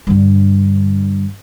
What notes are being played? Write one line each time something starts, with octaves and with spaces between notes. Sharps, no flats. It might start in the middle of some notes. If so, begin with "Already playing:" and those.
G2 D3